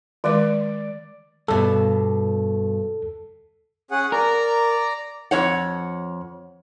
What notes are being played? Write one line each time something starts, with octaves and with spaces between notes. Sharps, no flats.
D#3 G#3 D5 D6
G2 B2 A4
C#4 G#4 F#5
A#4 D5 A#5
F2 C#5 F#5